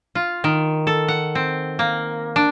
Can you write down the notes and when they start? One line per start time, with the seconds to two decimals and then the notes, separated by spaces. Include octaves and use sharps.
0.15 F4
0.44 D#3
0.87 A4
1.08 F#5
1.35 C4
1.79 A#3
2.36 D4